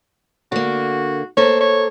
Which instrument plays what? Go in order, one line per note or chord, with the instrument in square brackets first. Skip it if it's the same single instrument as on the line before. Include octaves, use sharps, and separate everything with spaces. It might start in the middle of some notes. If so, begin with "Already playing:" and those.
[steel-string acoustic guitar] D3 A#3 [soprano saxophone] F#4
[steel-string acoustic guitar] A#3 A4 C5 [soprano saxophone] C#5
[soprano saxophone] C#5